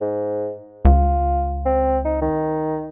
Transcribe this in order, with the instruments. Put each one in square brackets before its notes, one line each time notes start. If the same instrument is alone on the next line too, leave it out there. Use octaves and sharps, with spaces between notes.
[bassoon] G#2
[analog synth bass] C#2 [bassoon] F4
[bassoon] C4
D#4
D#3